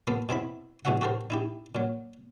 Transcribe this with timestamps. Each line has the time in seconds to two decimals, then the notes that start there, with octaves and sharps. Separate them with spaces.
0.07 F3 A#3 B3 A4
0.29 B2 C4 E4 B5
0.85 A1 B2 G#3 F#4 E5 F#5
1.01 F#4 G4 A4 A#4 C5
1.30 D#4 E4 G4
1.75 A#2 F#3